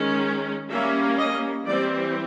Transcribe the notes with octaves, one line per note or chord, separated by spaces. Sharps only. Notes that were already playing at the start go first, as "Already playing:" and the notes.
Already playing: D#3 G#3 C#4
G3 A#3 C#4 E5
D#5
E3 G3 C4 D5